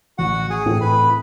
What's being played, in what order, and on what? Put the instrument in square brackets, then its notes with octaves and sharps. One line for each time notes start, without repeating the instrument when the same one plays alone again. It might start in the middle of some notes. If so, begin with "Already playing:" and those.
[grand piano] A1 [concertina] F#4 F#5
[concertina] G#4 G#5
[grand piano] A2 E3 A3 C4
[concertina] B4 B5